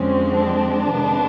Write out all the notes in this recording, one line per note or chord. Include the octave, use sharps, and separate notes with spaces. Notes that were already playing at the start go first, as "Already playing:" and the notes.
Already playing: F2 D3 F3 G#3 C4 C#4
D4
F2 C3 D#3 G#3 B3